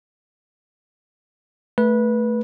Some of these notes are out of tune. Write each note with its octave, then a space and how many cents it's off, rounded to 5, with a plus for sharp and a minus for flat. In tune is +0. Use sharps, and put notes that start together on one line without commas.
A3 +0 B4 -20